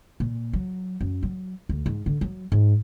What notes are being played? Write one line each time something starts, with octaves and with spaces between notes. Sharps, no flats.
A#2
F#3
F#2
F#3
D2
G#2
D3
F#3
G#2